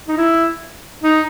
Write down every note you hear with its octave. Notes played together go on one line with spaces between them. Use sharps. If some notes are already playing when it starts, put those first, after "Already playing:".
D#4
E4
D#4